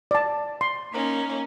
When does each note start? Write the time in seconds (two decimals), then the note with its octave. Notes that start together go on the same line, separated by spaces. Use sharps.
0.11 D5 A5
0.61 C6
0.93 A#3 C#4 D#4